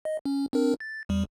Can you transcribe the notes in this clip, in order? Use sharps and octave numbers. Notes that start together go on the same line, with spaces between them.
D#5
C#4
C4 D4 A#4
A6
E2 G3